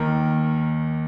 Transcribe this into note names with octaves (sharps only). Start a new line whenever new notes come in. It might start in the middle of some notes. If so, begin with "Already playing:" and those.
Already playing: D#2 D#3 A#4